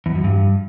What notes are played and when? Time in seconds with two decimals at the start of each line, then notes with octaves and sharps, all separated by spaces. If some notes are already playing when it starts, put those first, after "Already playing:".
0.06 E2
0.15 F#2
0.24 G2